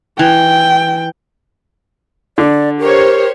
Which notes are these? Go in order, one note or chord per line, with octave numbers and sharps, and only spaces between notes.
E3 G5
D3 D5
G4 A#4 C5 C#5